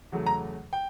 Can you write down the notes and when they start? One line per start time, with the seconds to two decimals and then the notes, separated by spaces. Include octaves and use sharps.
0.12 E2 C#3 F#3 A3
0.26 A#5
0.73 G5